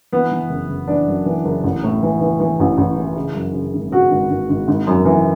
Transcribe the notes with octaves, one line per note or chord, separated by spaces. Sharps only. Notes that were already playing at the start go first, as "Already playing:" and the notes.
E3 B3
E3
F#1
F#1
E3 D4
F#2
E3
F#1
A1
A2
E3
E3
E3
A1
A1
E3
C#3
F#2
C#3
G#1
C#3 F#4
G#1
G#1
G#1
G#1
F#2
E3